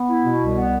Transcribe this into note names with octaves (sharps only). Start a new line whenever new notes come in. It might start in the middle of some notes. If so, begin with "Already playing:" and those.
Already playing: B3
E4
B2
C2
B3